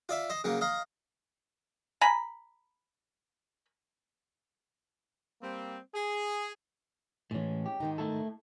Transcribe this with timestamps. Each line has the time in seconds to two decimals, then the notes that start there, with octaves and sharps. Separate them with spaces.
0.09 F4 D5 E5
0.30 C5 D#5
0.44 C#3 F#3 A#3
0.61 D#5 F5 A#5
2.01 G#5 A#5 B5
5.42 G3 A#3 C4
5.94 G#4
7.31 A2 E3 G#3 C#4
7.66 G4
7.80 G#2 D#3 D#4
7.98 A3 E4 A4